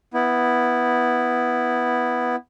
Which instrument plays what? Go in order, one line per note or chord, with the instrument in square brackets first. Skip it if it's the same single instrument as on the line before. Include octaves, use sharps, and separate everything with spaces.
[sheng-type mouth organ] B3 E4